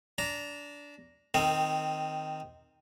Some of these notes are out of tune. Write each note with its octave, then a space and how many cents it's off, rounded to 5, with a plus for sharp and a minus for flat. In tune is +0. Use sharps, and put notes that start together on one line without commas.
D4 -20 A#5 +0
D#3 +0 C4 +0 A#4 -35